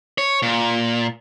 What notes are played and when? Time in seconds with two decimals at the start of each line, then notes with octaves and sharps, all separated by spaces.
0.18 C#5
0.42 A#2